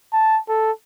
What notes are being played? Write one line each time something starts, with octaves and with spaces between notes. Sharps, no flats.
A5
A4